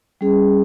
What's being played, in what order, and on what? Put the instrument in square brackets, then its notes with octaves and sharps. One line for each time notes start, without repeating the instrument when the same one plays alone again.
[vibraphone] G3 C#4 G#4